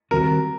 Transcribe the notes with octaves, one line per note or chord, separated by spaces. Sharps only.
D#3 G3 C4 F#4 A#4